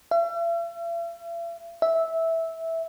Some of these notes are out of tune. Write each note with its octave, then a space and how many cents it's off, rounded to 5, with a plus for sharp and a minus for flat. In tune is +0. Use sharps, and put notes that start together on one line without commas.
E5 +45
E5 -10